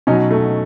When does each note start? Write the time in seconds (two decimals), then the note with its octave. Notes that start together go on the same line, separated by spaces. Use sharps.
0.07 B2 F#3 C#4 D#4
0.31 A3